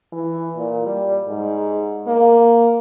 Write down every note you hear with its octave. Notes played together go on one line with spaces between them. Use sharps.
E3
A#2
G3
G#2
A#3